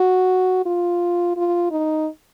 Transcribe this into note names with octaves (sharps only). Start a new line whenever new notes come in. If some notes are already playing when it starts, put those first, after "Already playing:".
Already playing: F#4
F4
F4
D#4